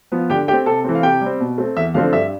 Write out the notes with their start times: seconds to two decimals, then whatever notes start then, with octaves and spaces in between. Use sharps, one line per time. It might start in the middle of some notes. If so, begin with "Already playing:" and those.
0.12 F3 B3
0.30 D3 G4 G5
0.48 A3 C4 G4 G5
0.66 C3 A4 A5
0.84 E3 A3 C4
0.95 F5
1.03 C3 G4 G5
1.21 G3 C4
1.40 B2
1.58 A3 C4
1.76 E2 E5
1.94 D3 F3 A3 C4 F5
2.13 G2 E5